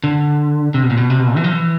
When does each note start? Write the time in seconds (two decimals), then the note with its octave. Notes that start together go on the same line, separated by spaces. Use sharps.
0.04 D3
0.74 C3
0.83 B2
0.90 A#2
0.97 B2
1.10 C3
1.20 B2
1.27 A#2
1.36 E3
1.44 F3
1.52 E3